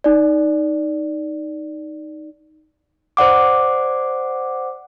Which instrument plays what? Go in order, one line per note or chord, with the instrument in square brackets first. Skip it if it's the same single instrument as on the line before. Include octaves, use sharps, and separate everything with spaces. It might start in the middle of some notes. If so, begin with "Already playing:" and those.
[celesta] D#4 D5
[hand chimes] C5 D5 F#5 D6